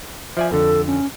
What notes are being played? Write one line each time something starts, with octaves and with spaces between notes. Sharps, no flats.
F3 D5 E5 G#5
F2 D3 A4
C#4